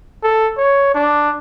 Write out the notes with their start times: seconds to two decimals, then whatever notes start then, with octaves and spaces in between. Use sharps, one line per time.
0.23 A4
0.58 C#5
0.95 D4